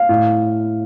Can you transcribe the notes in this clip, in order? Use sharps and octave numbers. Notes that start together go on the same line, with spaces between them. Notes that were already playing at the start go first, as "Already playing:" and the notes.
Already playing: F5
A2